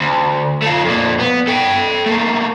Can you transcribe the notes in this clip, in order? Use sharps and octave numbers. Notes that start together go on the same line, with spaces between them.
D2
A3 F4
F2 A#2
B3
A4 G5
A3 A#3